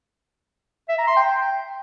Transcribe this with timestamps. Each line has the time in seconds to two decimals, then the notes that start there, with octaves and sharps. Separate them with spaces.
0.89 E5
0.98 A#5
1.07 C6
1.17 G5